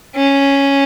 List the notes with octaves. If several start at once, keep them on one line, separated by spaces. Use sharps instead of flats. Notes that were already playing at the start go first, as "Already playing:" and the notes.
C#4